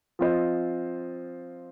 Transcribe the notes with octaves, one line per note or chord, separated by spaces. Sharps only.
F3 C4 F4 C5 D#5